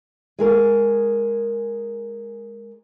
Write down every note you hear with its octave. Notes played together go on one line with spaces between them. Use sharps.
G#3 G#4 A#4